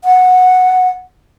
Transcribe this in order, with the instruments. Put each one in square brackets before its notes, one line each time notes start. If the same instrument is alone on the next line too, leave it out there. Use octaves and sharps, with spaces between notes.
[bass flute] F#5